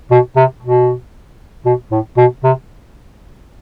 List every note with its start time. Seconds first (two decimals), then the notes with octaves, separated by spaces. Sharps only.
0.11 B2
0.36 C3
0.62 B2
1.66 B2
1.91 A2
2.17 B2
2.43 C3